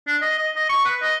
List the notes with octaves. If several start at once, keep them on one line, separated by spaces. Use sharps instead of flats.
D4
D#5
D#5
D#5
C#6
B4
D#5